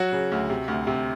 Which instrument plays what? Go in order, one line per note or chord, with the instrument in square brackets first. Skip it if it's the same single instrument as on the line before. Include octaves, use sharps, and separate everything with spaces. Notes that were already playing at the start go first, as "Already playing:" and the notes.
Already playing: [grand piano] F#3 F#4
C#3
D2
C3
D2
C3